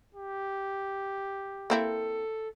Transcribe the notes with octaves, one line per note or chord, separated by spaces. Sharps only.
G4
A#3 C4 E4 A4